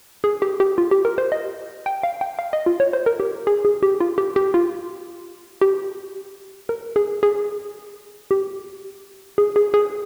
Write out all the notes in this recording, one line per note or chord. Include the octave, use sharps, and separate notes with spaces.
G#4
G4
G4
F4
G4
A#4
C5
D#5
G5
F5
G5
F5
D#5
F4
C#5
C5
A#4
G4
G#4
G#4
G4
F4
G4
G4
F4
G4
A#4
G#4
G#4
G4
G#4
G#4
G#4